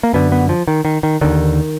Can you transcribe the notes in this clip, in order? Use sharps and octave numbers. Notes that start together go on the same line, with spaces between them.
A#3
F#2 D3 B3
B3
F3
D#3
D#3
D#3
D#2 D3 D#3